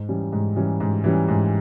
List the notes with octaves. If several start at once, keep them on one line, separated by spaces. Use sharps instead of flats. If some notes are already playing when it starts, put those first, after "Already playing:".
Already playing: G#2
E3 G3 C#4
G#2
E3 G3 C#4
G#2
E3 G3 C#4
G#2